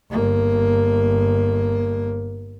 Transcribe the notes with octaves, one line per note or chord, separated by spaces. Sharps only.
G1 A#3